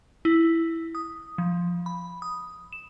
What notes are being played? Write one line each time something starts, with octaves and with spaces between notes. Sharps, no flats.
E4
D#6
F3
B5
D#6
E7